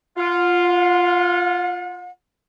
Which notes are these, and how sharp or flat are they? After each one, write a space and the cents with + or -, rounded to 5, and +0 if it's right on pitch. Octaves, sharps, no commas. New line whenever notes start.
F4 +0 F#5 -45